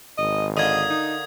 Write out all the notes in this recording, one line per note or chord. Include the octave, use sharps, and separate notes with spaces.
G#1 D#5
D3 A#3 D#5 D#6 G#6
D#4